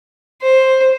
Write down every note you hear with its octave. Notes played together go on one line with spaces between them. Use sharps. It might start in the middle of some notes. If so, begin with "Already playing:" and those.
C5